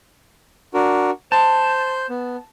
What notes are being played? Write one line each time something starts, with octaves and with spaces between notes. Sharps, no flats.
D4 F#4 A#4
C5 A5 G6
B3